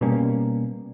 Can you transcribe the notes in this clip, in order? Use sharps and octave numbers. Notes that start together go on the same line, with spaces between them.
B2 G3 A#3 C#4